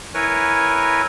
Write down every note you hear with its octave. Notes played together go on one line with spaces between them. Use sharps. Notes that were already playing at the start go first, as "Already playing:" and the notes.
E4 A#4 B4 C#5 G#5